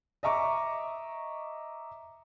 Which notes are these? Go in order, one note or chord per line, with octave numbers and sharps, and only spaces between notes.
D#5 E5 A#5 C#6 D6